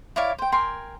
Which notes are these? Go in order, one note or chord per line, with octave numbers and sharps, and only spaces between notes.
E4 C#5 D5 F5
C5 G5
A#4 G5 G#5 C6